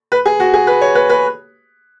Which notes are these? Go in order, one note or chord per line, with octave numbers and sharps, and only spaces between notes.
B4
G#4
F#4
G#4
B4
C#5
B4
B4